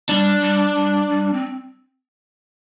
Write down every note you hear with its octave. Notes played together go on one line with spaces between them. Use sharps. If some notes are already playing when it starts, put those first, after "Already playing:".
G3 D4
G3
G3
G3
C4